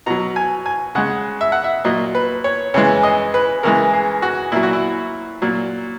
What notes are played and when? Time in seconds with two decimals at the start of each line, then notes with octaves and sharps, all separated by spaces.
0.06 B2 F#3 A#5
0.36 G#5
0.66 G#5
0.95 C#3 G#3 F#5
1.41 E5
1.52 F#5
1.64 E5
1.84 A#2 F#3 D#5
2.15 B4
2.44 C#5
2.74 C#3 E3 G#3 C#5
3.03 D#5
3.34 B4
3.63 C#3 E3 G#3 A#4
3.93 G#4
4.22 F#4
4.52 A#2 F#3 E4
4.63 F#4
4.73 E4
5.42 A#2 F#3